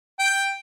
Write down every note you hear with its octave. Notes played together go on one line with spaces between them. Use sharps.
G5